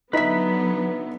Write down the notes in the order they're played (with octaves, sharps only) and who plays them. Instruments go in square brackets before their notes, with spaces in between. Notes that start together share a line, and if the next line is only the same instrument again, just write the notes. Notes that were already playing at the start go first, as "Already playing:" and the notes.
[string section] D3 F#3 B3 [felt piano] D#4 E5 B6 [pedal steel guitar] B4 B5